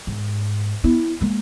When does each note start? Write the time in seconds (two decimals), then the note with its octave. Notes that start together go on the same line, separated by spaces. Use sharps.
0.07 G#2
0.84 B3 E4
1.21 G#3 A#3